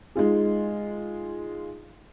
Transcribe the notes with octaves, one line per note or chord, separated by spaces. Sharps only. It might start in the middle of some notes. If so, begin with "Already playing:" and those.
G#3 D#4 F4 G#4